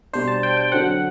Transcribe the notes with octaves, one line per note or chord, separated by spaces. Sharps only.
B2 G3 D4 C5
A5
G5
G5
D3 F#3 C4 F#5